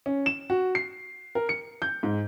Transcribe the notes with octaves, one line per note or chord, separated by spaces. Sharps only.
C#4
E7
F#4
C7
A#4
C#7
G6
G#2